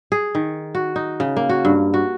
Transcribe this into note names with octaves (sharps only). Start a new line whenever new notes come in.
G#4
D#3
F#4
D#4
C#3
A#3
F#4
G2
F#4